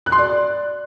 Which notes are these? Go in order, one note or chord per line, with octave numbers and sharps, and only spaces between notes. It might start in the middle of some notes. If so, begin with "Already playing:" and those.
F#6
C6
D5